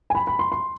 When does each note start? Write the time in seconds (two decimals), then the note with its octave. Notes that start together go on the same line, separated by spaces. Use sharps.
0.10 G#5
0.15 B5
0.27 B5
0.39 C6
0.52 C6